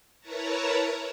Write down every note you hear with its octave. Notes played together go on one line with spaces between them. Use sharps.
E4 A#4 B4 C#5 A5 A#5